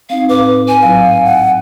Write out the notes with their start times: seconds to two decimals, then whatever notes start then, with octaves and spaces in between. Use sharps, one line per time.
0.10 C4 D#4 F5
0.29 A2 B4 D6
0.68 G#5
0.82 G#2 F#3 E4 F5
1.25 F#5